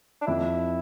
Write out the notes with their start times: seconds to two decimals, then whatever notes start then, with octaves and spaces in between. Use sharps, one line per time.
0.21 D4
0.27 F2 E4